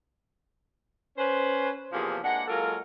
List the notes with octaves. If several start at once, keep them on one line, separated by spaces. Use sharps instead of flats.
C#4 B4 C5
E2 C3 F3 A#3 G#4
G#3 A#3 D4 F#5
F#3 G#3 A#3 F4 A4 A#4